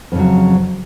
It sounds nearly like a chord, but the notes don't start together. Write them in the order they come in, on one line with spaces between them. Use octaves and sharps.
F2 C#3 F#3